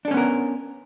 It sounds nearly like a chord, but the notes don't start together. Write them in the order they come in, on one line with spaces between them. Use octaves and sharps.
D4 A4 C#4 B3 A#4